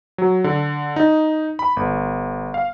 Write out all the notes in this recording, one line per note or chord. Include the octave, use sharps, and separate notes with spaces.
F#3
D3
D#4
B5
G1
F5